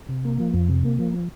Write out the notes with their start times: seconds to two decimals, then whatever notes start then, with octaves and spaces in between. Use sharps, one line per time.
0.09 C3
0.25 A#3
0.40 F3
0.54 F2
0.69 C3
0.85 A#3
0.99 F3